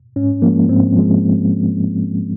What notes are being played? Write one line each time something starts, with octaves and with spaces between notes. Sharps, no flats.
G#2 C#4
F3 G#3 A#3
G#2 C4
F3 G#3